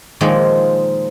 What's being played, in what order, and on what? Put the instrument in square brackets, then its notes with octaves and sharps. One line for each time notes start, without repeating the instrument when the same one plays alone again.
[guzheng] A#2 D#3 F3 G#3 A#3